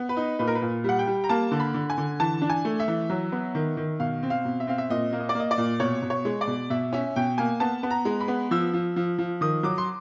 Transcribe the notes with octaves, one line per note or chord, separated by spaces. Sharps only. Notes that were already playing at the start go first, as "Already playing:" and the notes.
Already playing: B3
B4
D#4
A#2 B4
A#4
B4
A#2
G3 F#5
G5
G3
A#5
A#3 A5
D3
B5
D3
G#5
D3
E3 A5
D4
G#5
A3
E5
E3
F#3
B3
D#3
D#3
B2 F5
C4
F5
B2
E5
C4 F5
E5
A#2 D#5
A#3
D#5
D5
A#3 D#5
D5
A#2
B2 C#5
B2
C#5
G#3
D5
B2
B2 E5
C#4 E5
B2 G5
A#3 G#5
B3 A5
B3
A#5
G#3
B5
B3
F3 E6
F3
F3
F3
D#3 D#6
F#3 D6
C6